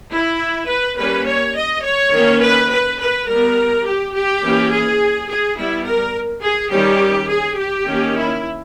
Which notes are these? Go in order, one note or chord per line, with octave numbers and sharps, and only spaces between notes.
E4
B4
G3 A#3 C#4 B4
C#5
D#5
C#5
D#3 A#3 C#4
B4
B4
B4
G3 B3 A#4
G4
G4
E3 A#3 C#4
G#4
G#4
G3 B3 E4
A#4
G#4
D#3 G3 C#4 G4
G#4
G4
D#3 A#3 C#4
E4